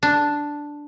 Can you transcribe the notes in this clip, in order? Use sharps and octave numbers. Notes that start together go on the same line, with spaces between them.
D4